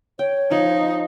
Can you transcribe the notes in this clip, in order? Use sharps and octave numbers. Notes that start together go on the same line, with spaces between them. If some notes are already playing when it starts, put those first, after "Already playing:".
C#5 G5
F3 D#4